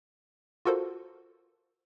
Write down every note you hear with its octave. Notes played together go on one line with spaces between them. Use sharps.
F4 F#4 A4 A#4 C5